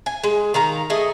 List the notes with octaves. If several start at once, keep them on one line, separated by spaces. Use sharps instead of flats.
G#5
G#3
D#3 F5 A#5
A3 G#4 D#5